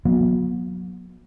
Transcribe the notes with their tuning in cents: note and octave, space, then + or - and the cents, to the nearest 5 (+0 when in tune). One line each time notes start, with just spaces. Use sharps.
F#3 -30 B3 -45